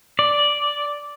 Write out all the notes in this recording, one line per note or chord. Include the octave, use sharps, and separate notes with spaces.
D5